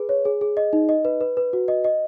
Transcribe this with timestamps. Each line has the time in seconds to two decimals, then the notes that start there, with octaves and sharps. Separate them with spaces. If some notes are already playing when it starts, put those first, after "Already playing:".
Already playing: G#4 B4
0.09 C#5
0.25 G#4
0.41 G#4
0.57 D#5
0.73 D#4
0.89 D#5
1.05 B4
1.21 B4
1.37 B4
1.53 F#4
1.68 D#5
1.84 D#5